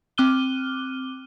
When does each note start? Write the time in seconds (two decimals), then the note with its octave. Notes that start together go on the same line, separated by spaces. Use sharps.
0.18 C4 D6 F6 F#6 D#7 G7